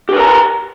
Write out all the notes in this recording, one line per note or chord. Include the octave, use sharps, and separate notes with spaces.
G4 A#4 B4 A#5